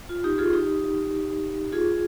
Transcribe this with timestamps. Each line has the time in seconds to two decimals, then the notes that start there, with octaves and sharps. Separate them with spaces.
0.09 F4
0.24 D#4 G4
0.38 F4 G#4
0.53 D#4 G4
1.72 F4 G#4